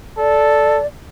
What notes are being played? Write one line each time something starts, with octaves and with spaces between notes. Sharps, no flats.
A4 D5